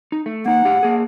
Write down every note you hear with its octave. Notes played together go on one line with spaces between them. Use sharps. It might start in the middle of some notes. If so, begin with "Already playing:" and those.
D#4
A3
A#3 D#4 F#5
A2 G4 F5
A#3 G#4